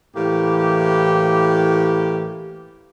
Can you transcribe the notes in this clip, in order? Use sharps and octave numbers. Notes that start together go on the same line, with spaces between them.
A2 E3 A#3 G4